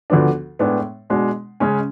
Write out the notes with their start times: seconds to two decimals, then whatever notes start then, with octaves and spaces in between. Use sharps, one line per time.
0.10 D2 D3 F3 B3 D4
0.59 A2 G#3 B3 D4
1.10 B2 G#3 D4
1.60 C#3 G#3 C#4